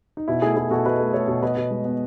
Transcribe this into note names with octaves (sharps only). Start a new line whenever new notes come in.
D#4
B2 E4
A3 E4 G#4
A3 E4 G#4
B2 F#4 A4
B2 B4 D#5
A3
A3 A4 C#5
B2
B2 B4 D#5
B2
G#3
B3